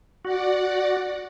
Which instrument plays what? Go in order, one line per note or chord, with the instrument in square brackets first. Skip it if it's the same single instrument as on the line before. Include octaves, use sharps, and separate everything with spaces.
[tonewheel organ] F#4 [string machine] D5 F#5